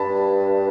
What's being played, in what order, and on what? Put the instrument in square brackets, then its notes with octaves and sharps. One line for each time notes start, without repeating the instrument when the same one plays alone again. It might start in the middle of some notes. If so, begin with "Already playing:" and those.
Already playing: [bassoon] G2 [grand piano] A5 B5